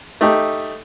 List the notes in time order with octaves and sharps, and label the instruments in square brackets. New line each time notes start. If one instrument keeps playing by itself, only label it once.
[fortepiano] A3 D#4 G4